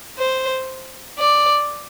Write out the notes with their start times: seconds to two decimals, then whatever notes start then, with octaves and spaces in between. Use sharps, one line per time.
0.19 C5
1.19 D5